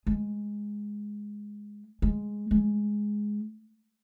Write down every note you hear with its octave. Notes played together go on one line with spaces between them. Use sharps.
G#3
G#3
G#3